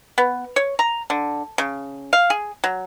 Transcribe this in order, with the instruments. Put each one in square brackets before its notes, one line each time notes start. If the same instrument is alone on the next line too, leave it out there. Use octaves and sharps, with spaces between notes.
[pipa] B3
C#5
A#5
D3
C#3
F5
G#4
F#3